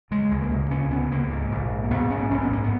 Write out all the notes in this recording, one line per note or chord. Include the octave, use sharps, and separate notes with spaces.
C#3 G#3
C#2
A#3
C#3
C#2 C#4
C#3 B3
C#2 A#3
G#2
A#1
G#2
A#3
A#1 B3
G#2 C#4
A#1 C#4
B3
G#2 A#3
B3